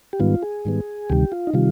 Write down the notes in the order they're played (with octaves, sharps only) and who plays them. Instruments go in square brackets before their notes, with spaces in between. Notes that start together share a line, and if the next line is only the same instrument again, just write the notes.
[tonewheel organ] G4
G#2 D#3 G3 B3 F4
G#4
G#2 D#3 G3 B3
D2 C3 D#3 G3 G4
F4
D#4
C3 D#3 G3 F4